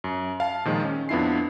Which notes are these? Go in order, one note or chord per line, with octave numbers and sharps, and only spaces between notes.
F#2
F5 A5
A#2 D#3 F3 G#3
C#4
F2 B3 D4 E4 F4 C7